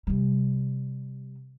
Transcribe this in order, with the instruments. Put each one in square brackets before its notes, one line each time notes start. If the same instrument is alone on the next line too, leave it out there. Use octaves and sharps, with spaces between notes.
[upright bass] C3 G3